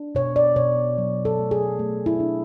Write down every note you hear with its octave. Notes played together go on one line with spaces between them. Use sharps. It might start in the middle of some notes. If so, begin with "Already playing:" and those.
Already playing: D4
B2 C#5
D5
B2 C#5
F#3
A4
A3
G#4
A3
E4
D4